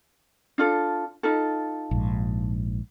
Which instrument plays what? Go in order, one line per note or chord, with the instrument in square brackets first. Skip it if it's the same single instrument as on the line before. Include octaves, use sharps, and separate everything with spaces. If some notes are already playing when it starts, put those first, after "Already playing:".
[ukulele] D4 F4 A4
D#4 F4 A4
[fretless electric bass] A#1 G#2